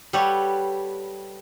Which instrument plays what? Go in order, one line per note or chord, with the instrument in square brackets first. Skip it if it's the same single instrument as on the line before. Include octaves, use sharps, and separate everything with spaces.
[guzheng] G3 G4 A4 B4 C#5 F#5